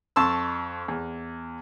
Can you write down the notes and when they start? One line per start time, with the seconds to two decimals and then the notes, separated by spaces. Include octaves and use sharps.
0.16 F2 A5 C6 C#6 E6
0.88 E2